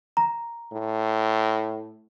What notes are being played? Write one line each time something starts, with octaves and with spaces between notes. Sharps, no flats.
A#5
A2